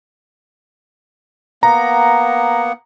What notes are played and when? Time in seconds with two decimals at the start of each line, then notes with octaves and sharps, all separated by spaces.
1.63 A#3 B3 F#5 A#5